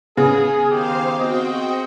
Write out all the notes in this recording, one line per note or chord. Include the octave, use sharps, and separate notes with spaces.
C#3 B3 G#4
D#3 G4 G#4 C5 F5
C4 F#4 D#5 G5